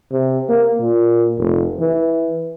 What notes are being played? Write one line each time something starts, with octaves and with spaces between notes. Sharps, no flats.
C3
A#3
A#2
F1
E3